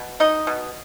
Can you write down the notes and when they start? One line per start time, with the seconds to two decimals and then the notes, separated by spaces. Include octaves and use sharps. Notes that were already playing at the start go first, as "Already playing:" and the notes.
Already playing: B2
0.20 D#4 D#5
0.47 B2